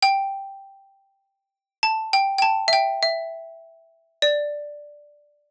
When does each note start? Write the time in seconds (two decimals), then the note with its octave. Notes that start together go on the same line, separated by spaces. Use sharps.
0.03 G5
1.83 A5
2.13 G5
2.38 G5
2.42 A5
2.68 E5
2.73 G5
3.03 E5
4.22 D5